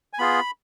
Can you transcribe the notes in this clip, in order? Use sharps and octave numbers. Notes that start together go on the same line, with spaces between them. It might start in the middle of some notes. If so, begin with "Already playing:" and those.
G#5
B3 F4 G#4 B5